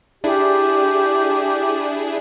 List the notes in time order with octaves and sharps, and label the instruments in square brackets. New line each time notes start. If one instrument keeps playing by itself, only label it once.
[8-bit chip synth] D4 E4 G#4 [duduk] G4